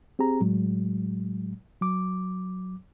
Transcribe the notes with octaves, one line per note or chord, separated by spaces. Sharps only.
C4 G4 G#4 A#5
A2 F#3 G#3
F#3 D6